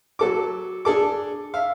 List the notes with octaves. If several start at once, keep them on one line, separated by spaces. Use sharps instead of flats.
F#3 A4 D6
D4 G#4 A4 D6
E5 F5